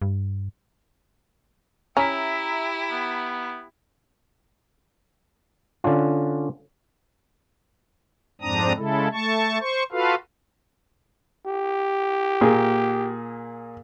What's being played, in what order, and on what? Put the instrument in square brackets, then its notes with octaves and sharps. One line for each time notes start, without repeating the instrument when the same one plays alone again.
[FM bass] G2
[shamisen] C#4 [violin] E4 G4 [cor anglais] E5 [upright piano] A#5 B6
[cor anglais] B3
[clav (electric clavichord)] D3 C#4 D4 F4
[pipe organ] F2 G#2 C4 D4 A#5 D#6
C#3 G#3 E4 A4
A3 A5 C#6
C5 C#6
F4 F#4 A4 B4 F5
[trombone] G4
[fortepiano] A#2 A#3 G#4